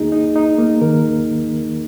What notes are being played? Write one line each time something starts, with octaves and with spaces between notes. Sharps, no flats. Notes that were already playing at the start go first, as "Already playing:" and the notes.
Already playing: D#2 A#3 D#4 G#4
D#4
D#4
A#3
D#3 A#4
D#2